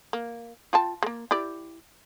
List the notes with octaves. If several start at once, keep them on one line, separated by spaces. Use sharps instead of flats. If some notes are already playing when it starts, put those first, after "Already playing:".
A#3
F4 G5 A5
G#3 A#3
E4 G4 D5